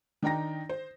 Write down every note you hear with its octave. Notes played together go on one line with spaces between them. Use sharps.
D#3 D4 D#4 G5 A#5 A#6
C5